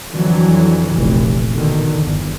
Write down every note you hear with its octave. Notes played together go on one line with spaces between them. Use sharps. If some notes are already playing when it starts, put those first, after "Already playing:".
F2 D3 E3 F#3
F1 A#1 E3
B2 D3 D#3
G1 E2